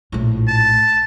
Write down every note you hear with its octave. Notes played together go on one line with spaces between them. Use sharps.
A#1 A2
A5